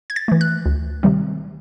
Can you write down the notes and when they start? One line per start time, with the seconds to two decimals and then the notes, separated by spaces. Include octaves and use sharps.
0.10 G#6
0.16 A6
0.28 E3 A3
0.41 F#6
0.66 D2
1.03 C3 D#3 G3 C4